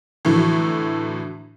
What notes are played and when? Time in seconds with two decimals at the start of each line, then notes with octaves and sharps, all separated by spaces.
0.25 A2 D3 E3 F#3